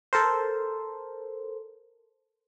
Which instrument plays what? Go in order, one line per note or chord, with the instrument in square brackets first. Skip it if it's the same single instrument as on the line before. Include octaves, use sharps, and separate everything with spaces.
[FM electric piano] A4 A#4 C5